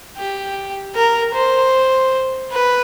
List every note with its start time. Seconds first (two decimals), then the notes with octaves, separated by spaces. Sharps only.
0.17 G4
0.95 A#4
1.35 C5
2.52 B4